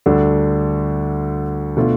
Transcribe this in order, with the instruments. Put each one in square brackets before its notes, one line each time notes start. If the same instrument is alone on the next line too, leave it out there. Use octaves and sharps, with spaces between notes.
[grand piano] D2 D3 G3 D4 A4
B2 A3 D4 F4